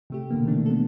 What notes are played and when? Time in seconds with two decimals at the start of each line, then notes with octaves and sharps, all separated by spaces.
0.10 C3 A3 G4
0.30 B2 D3 A#3
0.46 D#3 E3 A3 D4
0.66 B3 A4